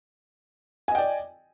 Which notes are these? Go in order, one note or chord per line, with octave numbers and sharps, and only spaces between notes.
D5 D#5 G5 G#5